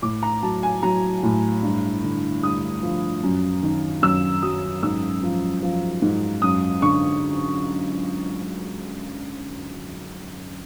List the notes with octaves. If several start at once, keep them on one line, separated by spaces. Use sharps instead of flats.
A2 D6
A#5
F#3 A5
G#5
F#3 A#5
A2
G2
D3
G2 D#6
F3
F#2
D#3
F#2 E6
F#3 D#6
G#2 E6
F3
F3
G#2
F#2 D#6
D3 C#6